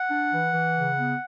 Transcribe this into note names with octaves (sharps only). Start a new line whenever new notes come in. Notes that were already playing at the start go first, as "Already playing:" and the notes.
Already playing: F#5
D4
E3
E3
C#3
B3